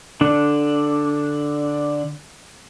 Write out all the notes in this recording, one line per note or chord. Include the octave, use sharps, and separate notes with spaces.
D3 D4